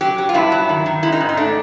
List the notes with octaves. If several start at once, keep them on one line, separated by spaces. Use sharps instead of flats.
F#3 G4
F#3
F4
G2 E4
F#3
D#3
D#3
G#3 E4
D#4
G#2
D#4
A3 D4